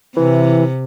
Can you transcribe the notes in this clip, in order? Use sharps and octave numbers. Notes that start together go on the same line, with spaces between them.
C3 E3